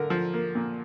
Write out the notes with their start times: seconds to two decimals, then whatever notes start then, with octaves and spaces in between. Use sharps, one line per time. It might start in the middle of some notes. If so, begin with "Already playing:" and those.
Already playing: D3 A#4
0.10 F3
0.34 A#3
0.55 A#2